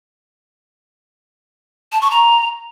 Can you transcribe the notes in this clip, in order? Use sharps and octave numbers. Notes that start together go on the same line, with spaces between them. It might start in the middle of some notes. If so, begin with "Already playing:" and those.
A5
C#6
A#5